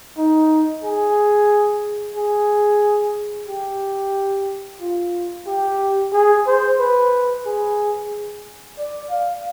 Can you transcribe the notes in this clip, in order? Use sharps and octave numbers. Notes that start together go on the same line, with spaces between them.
D#4
G#4
G#4
G4
F4
G4
G#4
C5
B4
G#4
D5
F5